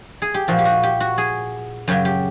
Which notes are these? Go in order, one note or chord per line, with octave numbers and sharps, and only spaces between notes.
G#4
G4
A#2 F3 F#4
G4
F#4
G4
F#4
G#4
F#2 C#3 F#3 G4
G4